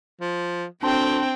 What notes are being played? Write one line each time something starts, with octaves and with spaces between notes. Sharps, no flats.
F3
D2 C4 D4 G5 A5 C6